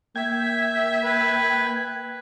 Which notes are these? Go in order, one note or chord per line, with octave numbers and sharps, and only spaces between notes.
A#3 E5 G5 G#6
B4